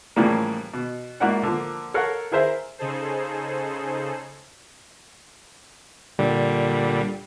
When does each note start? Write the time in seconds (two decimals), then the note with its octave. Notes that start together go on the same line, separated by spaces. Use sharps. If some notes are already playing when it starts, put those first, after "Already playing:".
0.16 A2 C#3 E3 F3 G3 A#3
0.73 B2
1.20 G#2 A#3 E4 F#4 D5 F#5
1.43 D3 F3 A#3
1.94 A4 A#4 C#5 F5 F#5 A#5
2.32 E4 G#4 A#4 C5 E5
2.78 C#3 D#4 G#4 A4 C5
6.19 A#2 D3 G3